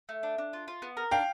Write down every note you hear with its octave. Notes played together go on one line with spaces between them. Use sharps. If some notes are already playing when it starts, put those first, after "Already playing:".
A3
D4
D4
F4
F4
B3
A#4
D4 F5 G5